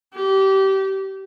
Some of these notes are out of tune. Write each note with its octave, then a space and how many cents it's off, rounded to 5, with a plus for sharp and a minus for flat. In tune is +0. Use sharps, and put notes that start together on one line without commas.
G4 -25